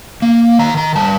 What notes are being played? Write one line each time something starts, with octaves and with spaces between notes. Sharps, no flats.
A#3
D#3 A#5
A#5
G3 A5